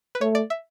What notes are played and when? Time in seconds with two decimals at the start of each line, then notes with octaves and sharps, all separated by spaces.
0.15 B4
0.21 A3 C#5
0.35 D5
0.50 E5